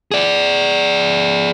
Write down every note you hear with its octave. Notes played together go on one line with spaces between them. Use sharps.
G#4 D5